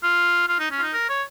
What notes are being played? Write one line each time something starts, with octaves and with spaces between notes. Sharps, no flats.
F4
F4
D#4
C#4
F4
D#4
A#4
C#5